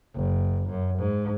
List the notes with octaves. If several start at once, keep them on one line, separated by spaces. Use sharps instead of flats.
F#1
F#2
G#2